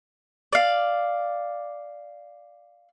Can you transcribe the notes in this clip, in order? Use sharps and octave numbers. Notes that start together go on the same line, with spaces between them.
D5 F5